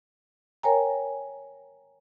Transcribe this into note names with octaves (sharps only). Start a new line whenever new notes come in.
A#4 C#5 G5 G#5 A#5